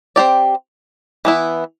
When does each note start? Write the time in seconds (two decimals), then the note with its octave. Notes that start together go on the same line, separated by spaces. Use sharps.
0.16 C4 G4 D5
1.25 E3 B3 E4